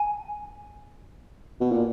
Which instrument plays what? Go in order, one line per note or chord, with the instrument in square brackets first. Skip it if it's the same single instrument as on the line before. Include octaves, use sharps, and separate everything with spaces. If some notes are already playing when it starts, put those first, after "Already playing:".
Already playing: [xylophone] G#5
[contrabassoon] B2
A#2